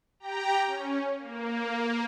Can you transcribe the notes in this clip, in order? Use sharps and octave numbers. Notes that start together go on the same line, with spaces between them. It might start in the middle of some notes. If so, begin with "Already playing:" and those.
G4 G5 A#5
C#4
A#3